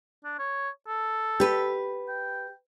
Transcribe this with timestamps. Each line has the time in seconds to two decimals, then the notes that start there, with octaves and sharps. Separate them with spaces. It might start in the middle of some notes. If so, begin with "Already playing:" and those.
0.24 D4
0.39 C#5
0.87 A4
1.40 G4 B4
2.08 G5